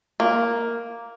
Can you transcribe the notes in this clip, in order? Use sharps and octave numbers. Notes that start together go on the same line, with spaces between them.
A#3